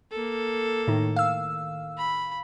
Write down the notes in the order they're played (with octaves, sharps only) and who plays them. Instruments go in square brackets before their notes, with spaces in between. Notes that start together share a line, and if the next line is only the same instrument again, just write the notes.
[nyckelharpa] A#3 A4
[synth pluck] A2 D#3
F5 E6
[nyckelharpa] B5